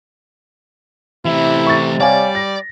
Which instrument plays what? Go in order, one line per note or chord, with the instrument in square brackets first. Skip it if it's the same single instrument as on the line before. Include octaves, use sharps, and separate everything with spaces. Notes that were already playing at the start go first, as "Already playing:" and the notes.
[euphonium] C3 [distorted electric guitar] E3 A3 [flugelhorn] E4
[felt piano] C#6 A6
[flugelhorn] G3 [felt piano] C#5 F5 G#5 [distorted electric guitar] D5
[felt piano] A#6